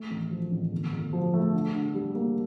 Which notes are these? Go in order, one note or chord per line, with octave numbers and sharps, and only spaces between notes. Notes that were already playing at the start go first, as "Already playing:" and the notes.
Already playing: A3
A1
F3
A1
G1
G1
F3
A3
D3
D3
G3
A#3